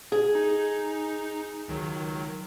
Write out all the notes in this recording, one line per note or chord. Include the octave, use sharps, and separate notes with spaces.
G#4
D#4
C#2 D#3 F#3